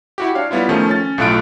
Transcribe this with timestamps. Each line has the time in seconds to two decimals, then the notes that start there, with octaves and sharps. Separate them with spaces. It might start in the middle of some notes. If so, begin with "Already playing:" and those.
0.18 E4 F#4 G4
0.35 D4 C#5 F5
0.51 G3 B3 E4 F4
0.69 D#3 F3 A3 C#4
0.90 C#4 A6
1.18 B1 A2 A3 F4 F#6 D7